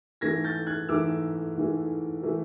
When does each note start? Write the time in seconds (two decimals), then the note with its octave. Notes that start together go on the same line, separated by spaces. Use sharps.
0.21 G#2 E3 A3 G#6 A#6
0.44 G6 A6
0.67 F#6 G#6
0.89 G#2 E3 A3 D6 E6
1.56 G#2 E3 A3
2.23 E3 A3